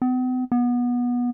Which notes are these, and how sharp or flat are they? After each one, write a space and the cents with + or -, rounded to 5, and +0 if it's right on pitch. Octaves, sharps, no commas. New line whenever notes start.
B3 +45
B3 -20